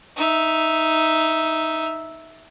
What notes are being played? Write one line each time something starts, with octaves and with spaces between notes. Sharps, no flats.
D#4 E5